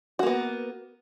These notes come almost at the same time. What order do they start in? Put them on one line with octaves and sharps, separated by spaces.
F#4 A#3 B3